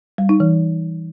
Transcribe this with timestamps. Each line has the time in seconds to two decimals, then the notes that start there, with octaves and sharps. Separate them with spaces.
0.18 G3
0.29 D#4
0.40 E3